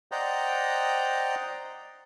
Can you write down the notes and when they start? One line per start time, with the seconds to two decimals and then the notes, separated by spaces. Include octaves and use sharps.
0.12 C5 D5 D#5 F#5 G5 A#5